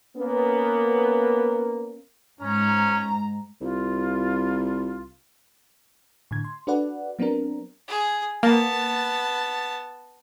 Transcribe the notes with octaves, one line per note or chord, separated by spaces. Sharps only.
A#3 B3 C#4
G#2 C#4 A#5
C2 F4
A2 D3 G#6
C6
D4 F#4 A4 B4 D5 F#5
F#3 B3 C4 D4 A#4
G#4
A#3 B3 A5